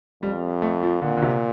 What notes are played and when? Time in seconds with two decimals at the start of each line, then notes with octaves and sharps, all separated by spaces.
0.23 F2 G3
0.62 A3
0.83 F3
1.02 A#2 D3
1.17 D3
1.22 C3